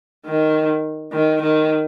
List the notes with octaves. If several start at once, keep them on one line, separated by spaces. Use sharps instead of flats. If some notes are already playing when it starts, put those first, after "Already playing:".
D#3
D#3
D#3